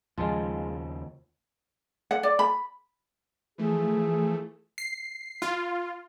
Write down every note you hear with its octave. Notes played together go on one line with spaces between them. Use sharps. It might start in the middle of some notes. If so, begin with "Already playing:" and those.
D#2 C#3 F3 G#3 F4
F#5
D5
B5
E3 F3 A3 G#4
C7
F4